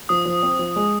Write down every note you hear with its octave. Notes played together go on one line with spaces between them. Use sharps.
F3 D#6
F3
C4
F3
G#3